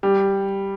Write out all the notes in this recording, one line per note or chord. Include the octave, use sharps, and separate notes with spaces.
G3